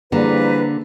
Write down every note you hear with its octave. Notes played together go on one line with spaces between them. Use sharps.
D3 E3 F3 G3 A#3 G#4 B4 A#5